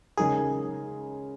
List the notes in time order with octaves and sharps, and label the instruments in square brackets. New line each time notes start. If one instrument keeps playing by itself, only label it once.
[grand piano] C#3 G#3 D#4 A#4 [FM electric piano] G#4